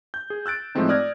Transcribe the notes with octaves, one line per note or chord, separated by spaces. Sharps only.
G6
G#4
E6 F#6 A6 D7
A2 F3 G#3 A3 C4 D#4
D5 D#6 F6 F#6 G#6 A#6